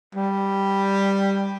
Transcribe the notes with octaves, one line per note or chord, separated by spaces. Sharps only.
G3